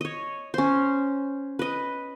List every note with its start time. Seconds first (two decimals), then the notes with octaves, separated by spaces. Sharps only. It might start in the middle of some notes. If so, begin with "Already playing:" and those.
0.01 C#5 D#5
0.54 C#4 C5
1.59 B4 D#5